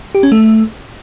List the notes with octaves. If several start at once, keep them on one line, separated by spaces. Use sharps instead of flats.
G4
C#4
A3